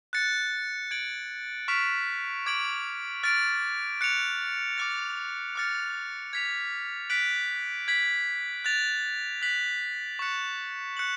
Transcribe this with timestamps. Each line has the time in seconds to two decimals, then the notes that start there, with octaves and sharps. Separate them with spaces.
0.13 F#6 A6 C#7
0.91 G#6 D7 F#7
1.68 C#6 F6 B6 D7 F7
2.46 D6 G#6 D7 F#7
3.23 F6 A6 D7
4.01 F#6 C#7 F7
4.78 D6 F6 A6
5.55 D6 F6 A6 C#7
6.33 G#6 B6 F7
7.10 F#6 B6 D7 F#7
7.88 G#6 B6 F#7
8.65 F#6 A6 F7
9.42 F#6 B6 F#7
10.19 C#6 F#6 C#7
10.97 F#6 C#7 F#7